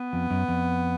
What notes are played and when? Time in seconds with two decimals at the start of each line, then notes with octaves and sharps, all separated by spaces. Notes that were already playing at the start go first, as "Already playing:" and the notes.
Already playing: B3
0.13 F2
0.31 F#2
0.48 F2